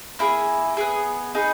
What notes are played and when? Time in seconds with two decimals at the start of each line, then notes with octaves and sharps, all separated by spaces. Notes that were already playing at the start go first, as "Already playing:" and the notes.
0.19 A#3 E4 G#4
0.77 B3 E4 G#4
1.35 D#4 G#4 B4